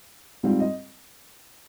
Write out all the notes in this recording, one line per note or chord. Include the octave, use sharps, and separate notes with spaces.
G#2 G3 C4 F4
D#5